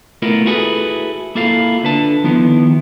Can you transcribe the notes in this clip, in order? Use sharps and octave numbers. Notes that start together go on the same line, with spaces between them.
A3 B3 E4 F4 A#4
E4 F#4 G#4 A4 B4
A#3 E4 F4 A4 F5
D3 B4 A5
D#3 F3 B3 E4